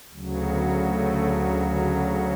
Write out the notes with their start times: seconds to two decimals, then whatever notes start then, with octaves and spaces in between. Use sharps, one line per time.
0.11 D2 C#3 F#3
0.48 B3
0.83 A3